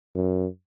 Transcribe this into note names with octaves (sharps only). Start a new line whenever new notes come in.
F#2